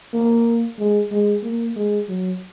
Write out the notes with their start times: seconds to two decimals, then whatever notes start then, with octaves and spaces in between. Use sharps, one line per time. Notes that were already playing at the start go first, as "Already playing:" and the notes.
0.14 A#3
0.78 G#3
1.12 G#3
1.43 A#3
1.76 G#3
2.09 F#3